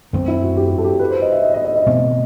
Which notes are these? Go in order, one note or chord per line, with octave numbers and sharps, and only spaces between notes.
F#2 D#3 A3 C4
E4
F#4
G4
G4
A4
G4
A4
B4
C5
D#5
E5
D#5
D#5
D#5
D#5
B2 A3 C4